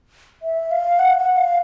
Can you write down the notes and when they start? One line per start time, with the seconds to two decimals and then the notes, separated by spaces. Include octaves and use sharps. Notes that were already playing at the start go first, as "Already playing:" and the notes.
0.42 E5
0.71 F5
0.99 F#5
1.18 F#5
1.37 F5